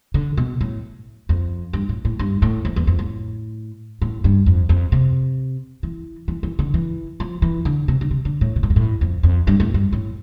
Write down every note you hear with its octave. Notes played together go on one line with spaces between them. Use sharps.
D3
B2
A2
F2
G2
A2
A2
G2
A2
F2
E2
F2
A2
A2
G2
F2
F2
C3
E3
E3
E3
D3
E3
F3
E3
D3
C3
D3
C3
D3
A2
B2
A2
G2
A2
F2
F2
G2
A2
G2
A2